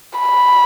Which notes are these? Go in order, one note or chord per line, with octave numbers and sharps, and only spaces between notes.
B5